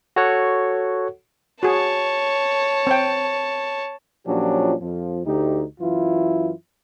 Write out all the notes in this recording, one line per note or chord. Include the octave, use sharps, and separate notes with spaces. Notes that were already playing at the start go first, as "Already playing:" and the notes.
F#4 A4 C#5 F#5
F#4 G#4 C#5 A5
C4 G5
A#2 F3 F#3 C#4 D4 G4
F2 F3
D2 D#4 G4
F#2 E3 E4 F4